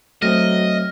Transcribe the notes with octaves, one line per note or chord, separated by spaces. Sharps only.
F#3 A3 C4 D#5 F6 A#6